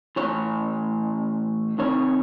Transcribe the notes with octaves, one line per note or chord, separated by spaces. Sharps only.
A2 E3 C#5
C3 D#3 C#5